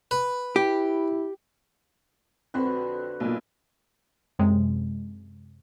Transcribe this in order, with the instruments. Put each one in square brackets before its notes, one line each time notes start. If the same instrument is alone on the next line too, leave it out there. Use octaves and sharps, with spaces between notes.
[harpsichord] B4
[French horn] E4 [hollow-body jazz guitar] G4
[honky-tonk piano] F2 C4 [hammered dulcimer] D3 F#4 B4
[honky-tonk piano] B1 A#2
[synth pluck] F#2 C3 G#3